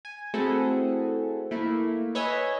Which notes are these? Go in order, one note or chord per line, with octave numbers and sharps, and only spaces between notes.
G#5
A3 C4 E4 F#4 G#4 A4
A3 A#3 E4
B4 C#5 D#5 E5 G#5